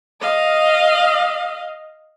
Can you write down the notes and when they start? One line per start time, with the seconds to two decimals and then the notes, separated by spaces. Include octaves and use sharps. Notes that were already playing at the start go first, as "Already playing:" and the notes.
0.21 D#5 F5